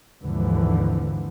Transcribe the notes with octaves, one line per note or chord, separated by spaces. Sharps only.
G#1 D#2 G#2 D3 E3 F3